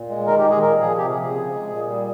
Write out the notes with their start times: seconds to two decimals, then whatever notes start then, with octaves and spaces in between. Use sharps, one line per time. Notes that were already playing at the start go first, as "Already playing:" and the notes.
Already playing: A#2
0.09 G#3
0.27 D#3 A#4
0.39 G4
0.45 G#3
0.50 G#4
0.62 A#2 A#4
0.80 F3 G#4
0.98 C3 G4
1.10 G#4
1.17 F3
1.22 G#4
1.34 C#3
1.52 G#3
1.70 A#2
1.87 G3